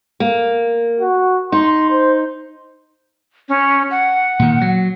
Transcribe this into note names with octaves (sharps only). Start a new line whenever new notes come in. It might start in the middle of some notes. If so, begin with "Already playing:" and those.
A#3
F#4
D#4 C6
C5
C#4
F#5
A#2 D#3
F#3